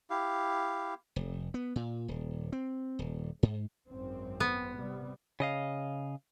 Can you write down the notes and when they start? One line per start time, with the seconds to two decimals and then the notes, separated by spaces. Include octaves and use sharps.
0.10 E4 G4 F5
1.16 F1
1.54 B3
1.76 A#2
2.08 D#1
2.52 C4
2.99 D#1
3.43 G#2
3.88 G#1 F#2 C4
4.40 B3
4.75 C3 G3
5.40 C#3 D#5 F5